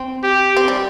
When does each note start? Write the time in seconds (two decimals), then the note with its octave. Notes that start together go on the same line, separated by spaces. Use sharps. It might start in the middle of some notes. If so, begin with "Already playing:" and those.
Already playing: C4
0.23 G4
0.57 C4
0.68 G3